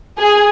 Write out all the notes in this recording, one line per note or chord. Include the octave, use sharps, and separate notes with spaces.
G#4